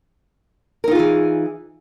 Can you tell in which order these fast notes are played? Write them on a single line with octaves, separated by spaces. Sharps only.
A#4 D#4 F4 G#4 E3